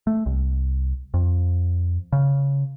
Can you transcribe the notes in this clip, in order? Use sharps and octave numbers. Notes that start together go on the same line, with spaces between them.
A3
C2
F2
C#3